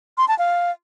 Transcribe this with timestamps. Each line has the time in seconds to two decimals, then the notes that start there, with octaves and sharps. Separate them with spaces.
0.18 C6
0.28 A5
0.39 F5